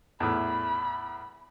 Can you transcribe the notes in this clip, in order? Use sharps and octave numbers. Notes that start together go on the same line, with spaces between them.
E2 A2 B5